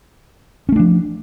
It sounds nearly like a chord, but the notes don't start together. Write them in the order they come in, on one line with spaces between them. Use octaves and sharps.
C#4 A3 D4 F3